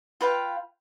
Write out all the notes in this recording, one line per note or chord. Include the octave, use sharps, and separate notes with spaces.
F4 B4 F5 G5